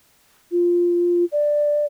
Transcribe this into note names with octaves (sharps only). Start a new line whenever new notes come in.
F4
D5